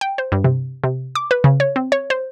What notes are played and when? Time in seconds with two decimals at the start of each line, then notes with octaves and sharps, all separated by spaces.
0.01 G5
0.18 C5
0.32 G2
0.44 C3
0.84 C3
1.15 D6
1.31 B4
1.44 C#3
1.60 C#5
1.76 C4
1.92 C#5
2.10 C5